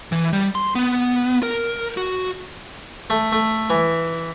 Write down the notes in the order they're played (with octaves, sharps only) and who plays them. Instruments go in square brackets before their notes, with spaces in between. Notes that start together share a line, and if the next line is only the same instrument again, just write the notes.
[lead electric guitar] E3
G3
C6
B3
A#4
F#4
[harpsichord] A3
A3
E3